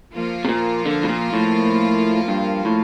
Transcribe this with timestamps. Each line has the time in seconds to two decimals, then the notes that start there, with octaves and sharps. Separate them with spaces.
0.13 F3 A#3 F4
0.45 C3
0.49 A#2
0.86 D3
1.03 A2
1.09 A#2
1.33 A2
2.28 G2
2.65 A2